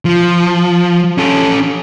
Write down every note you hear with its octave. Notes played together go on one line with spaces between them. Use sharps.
F3
C#4 A4